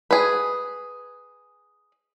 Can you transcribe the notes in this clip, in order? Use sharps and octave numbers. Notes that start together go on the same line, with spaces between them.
G#4 B4